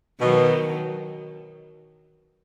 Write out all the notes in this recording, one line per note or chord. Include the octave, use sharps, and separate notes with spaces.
B2 D#3 F#3